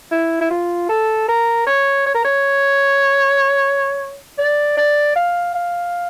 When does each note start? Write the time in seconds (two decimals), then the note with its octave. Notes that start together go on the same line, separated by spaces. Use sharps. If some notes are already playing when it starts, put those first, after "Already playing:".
0.12 E4
0.41 E4
0.50 F4
0.89 A4
1.28 A#4
1.67 C#5
2.06 C#5
2.15 A#4
2.25 C#5
4.39 D5
4.77 D5
5.16 F5
5.55 F5